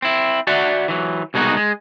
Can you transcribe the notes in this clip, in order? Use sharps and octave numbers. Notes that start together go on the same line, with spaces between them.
C4 E4
F#4 D5 E5 F#5
E3 F#3
C2 B2 G#3 D#4 F#4
G#3